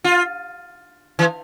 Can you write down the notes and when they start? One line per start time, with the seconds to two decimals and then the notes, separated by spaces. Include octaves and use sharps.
0.04 F4
1.19 E3